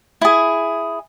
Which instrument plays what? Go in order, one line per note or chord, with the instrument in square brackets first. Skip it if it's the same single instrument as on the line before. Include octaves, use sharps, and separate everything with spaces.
[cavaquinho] E4 G#4